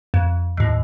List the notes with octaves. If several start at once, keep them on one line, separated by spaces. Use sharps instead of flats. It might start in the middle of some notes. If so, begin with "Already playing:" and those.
F2
D#2 A2